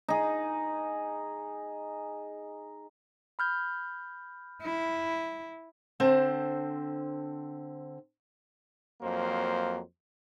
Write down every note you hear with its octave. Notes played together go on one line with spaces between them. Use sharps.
D#4 G#4
B5 F6 G6
E4
D3 C4 C5 A5
F2 F#3 A#3 C5